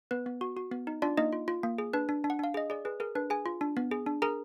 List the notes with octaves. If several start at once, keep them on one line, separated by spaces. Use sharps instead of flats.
B3 B4
B3
F#4
F#4
B3
D#4
D4 F4 D5
A#3 D#4 D#5
F4
F4
A#3
G#4
D4 B4
D4
D4
F#5
D4 F5
G#4 D#5
G#4 D5
G#4 B4
G#4 A#4
D4 B4
G#4 G#5
F4
D4
B3
G#4
D4
G#4 A#4 A#5